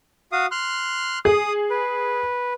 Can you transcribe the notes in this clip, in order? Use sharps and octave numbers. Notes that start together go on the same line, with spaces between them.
F#4 F5 D#6
C6 F6 F#6
G#4 D#6
B4